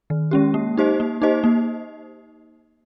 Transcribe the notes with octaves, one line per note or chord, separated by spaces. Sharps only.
D#3
G#3 C#4 G4
A#3
D#4 G4 C5 D#5
A#3
D#4 G4 C5 D#5
A#3